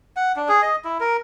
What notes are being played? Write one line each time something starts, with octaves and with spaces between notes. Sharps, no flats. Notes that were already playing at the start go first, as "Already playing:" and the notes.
F#5
D4
G#4
D#5
E4
A#4